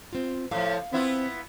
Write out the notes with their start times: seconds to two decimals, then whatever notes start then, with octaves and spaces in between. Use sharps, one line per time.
0.13 C4 F4
0.51 A2 F3 F5
0.93 B3 C4 E4 F4